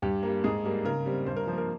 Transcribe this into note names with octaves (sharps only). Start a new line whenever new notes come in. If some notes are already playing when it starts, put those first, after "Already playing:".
G2 G4
G3 A#3
G#2 G#4
G3 A#3
C#3 A#4
G3 C4
G2 C5
A#4
F3 A#3 C5
A#4